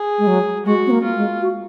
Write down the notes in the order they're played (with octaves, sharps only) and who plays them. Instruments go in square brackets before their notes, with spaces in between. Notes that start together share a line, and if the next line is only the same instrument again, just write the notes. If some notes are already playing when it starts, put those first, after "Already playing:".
Already playing: [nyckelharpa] G#4
[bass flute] G#3
F#3
[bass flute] G#3 [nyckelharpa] F#4
[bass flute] C4
A#3
[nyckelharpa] F4
[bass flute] G#3
F#4